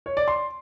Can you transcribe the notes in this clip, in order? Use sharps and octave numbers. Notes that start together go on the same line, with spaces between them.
C#5
D5
C6